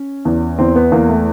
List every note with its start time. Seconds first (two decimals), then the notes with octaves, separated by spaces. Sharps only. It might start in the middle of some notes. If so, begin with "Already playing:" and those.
Already playing: C#4
0.25 E2
0.59 E2 C4
0.76 B3
0.92 E2 A#3
1.09 A3